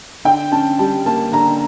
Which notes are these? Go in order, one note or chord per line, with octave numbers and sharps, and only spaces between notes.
D3 G5
C#4 A5
G3 A5
A#3 A5
D3 A#5